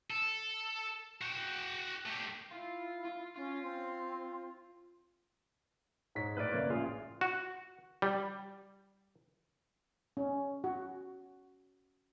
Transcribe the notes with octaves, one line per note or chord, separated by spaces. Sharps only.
A4
F#4 G5
A3 G4
E4 F4
F4
C#4 F4
C4
G#2 C#5 B6
A2 B4 D5 F6 D7
F#1 A#3 C#5
A1 F4 G#4
F#4
G3
C#4
F#4